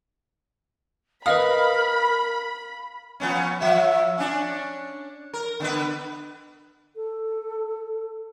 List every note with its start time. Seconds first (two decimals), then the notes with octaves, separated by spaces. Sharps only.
1.26 A#4 B4 D#5 F5 B5 D#6
3.20 F3 B3 C#4
3.60 F3 E5
4.18 C#4 D4
5.33 A#4
5.60 D3 B3 B4
6.95 A4